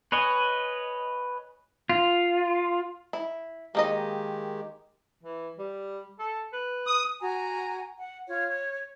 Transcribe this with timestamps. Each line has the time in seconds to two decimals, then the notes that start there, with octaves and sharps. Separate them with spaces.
0.12 B4 C#5 D#5 G#5
1.89 F4
3.13 E4
3.75 D#3 G#3 A#3 D#4 G4 D#5
5.23 E3
5.58 G3
6.19 A4
6.53 B4
6.87 D#6
7.21 F#4 G#5 A#5
7.98 F#5
8.27 F4 C#5
8.47 C#5